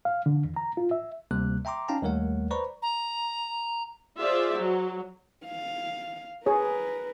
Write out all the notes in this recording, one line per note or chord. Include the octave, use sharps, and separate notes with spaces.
F5
D3
E2
A#5
F4
E5
D2 C3 G3 A#3 F#6
E5 G5 A#5 C6 D6
C#4 D#4 F5 G5 A5 A#5
D#2 G3 A3 A#4 C#5 F#5
B4 C5 D5 A#5 B5 C#6
A#5
F4 G#4 C5 D5 E5
F#3
F5
G#4 A#4 B4 C#5